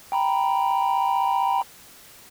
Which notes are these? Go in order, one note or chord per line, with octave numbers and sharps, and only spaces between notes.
G5 A#5 B5